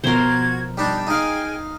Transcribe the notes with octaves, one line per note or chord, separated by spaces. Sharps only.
B2 F3 B3 F#4 A#4 C5 G#6
G3 D4 D#4 G6
D#4 G#4 F5 G5 G#5